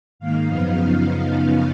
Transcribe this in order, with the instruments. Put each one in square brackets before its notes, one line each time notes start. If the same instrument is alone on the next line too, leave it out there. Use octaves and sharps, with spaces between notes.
[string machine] G#2 D#3 A#3 F5
F#2 C#3 F3 B3 D#4 F5